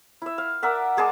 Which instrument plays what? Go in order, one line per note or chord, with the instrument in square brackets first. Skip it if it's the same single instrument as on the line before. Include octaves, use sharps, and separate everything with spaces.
[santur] E4 E5
F5
A#4 D5 E5 F#5
G#3 G#4 A5 D6